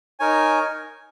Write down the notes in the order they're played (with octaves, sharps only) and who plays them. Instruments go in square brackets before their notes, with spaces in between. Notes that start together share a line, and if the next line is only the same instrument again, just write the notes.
[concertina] D#4 A#4 C#5 G#5